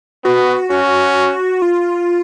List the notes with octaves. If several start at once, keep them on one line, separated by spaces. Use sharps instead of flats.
B3 F#4
C#4 F#4
F4